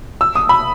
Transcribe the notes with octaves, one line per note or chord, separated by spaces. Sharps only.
E6
D#6
B5